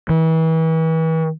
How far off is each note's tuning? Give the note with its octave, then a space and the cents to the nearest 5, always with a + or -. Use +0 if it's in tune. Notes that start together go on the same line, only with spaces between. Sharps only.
E3 -35